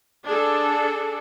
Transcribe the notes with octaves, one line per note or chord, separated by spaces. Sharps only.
D4 G#4 A4